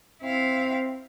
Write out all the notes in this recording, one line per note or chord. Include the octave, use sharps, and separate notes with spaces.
C4 E4 F5